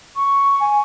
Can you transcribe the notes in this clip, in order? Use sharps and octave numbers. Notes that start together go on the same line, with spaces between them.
C#6
G#5